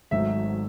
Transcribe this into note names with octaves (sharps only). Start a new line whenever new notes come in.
G#1 G#2 F#3 A3 E5